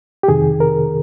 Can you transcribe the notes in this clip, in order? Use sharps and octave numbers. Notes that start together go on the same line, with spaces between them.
G4
F2 C3 D#3 G#4
A#4